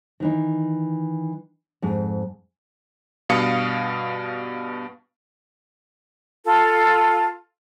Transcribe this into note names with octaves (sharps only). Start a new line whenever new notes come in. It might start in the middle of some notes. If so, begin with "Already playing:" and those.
D#3 E3 D#4
F2 G#2
G2 B2 F5 D#6 C#7
F4 A4